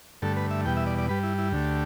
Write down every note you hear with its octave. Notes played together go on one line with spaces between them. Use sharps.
G2 D3 A3 A4
B4
E5
E2 B2 G3 G5
E5
D5
D5
G2 G3 B4
E4
E4
D2 D3 A3 G4